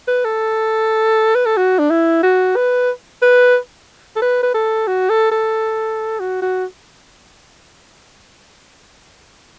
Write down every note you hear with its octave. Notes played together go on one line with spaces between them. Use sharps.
B4
A4
B4
A4
F#4
D4
E4
F#4
B4
B4
A4
B4
B4
A4
F#4
A4
A4
F#4
F#4